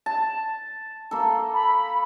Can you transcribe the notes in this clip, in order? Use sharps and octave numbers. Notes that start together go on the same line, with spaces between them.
A5
A#3 A4
B5